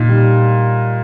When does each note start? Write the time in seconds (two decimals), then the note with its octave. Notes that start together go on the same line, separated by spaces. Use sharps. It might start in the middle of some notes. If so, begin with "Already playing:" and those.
Already playing: A#2 D#4
0.09 G3